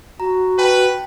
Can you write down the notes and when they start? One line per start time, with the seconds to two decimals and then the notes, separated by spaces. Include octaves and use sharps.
0.20 F#4 A#5
0.59 B4 G5 A5